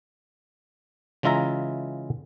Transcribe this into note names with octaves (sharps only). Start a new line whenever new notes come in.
C#3 E3 G#3 F4 E5 A#5